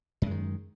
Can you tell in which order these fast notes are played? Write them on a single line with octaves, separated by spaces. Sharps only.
F#2 G#3 D#3